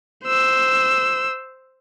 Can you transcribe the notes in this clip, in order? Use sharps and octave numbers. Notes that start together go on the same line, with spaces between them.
C5 E6